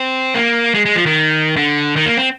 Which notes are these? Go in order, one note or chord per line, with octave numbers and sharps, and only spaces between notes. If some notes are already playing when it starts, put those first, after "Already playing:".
Already playing: C4
A#3
G#3
G#3
F3
D#3
D3
D#3
A#3
C4